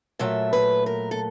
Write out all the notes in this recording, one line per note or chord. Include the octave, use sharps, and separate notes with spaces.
A#2 F#3 A3 E5
B4
A#4
A4